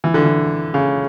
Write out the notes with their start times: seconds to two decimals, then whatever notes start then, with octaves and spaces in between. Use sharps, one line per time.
0.04 E3
0.14 D3
0.25 E3
0.74 C#3